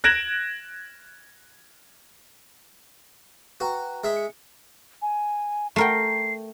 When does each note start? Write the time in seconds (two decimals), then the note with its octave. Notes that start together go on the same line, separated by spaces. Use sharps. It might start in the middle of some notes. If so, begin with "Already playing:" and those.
0.04 F#6 G#6 A#6 D7 E7 F#7
3.60 F#4 B4 G5 A#5
4.04 G#3 E5
4.16 C#7
5.02 G#5
5.76 A3 A#4 G5 C7